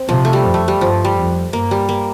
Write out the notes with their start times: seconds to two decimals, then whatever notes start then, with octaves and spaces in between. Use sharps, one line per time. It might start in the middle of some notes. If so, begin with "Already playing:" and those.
Already playing: C4
0.09 C3 F3
0.25 A3
0.33 G3
0.45 F2
0.54 A3
0.68 G3
0.81 G2 F3
1.05 G3
1.17 F2
1.53 G2 A#3
1.71 G3
1.89 A#3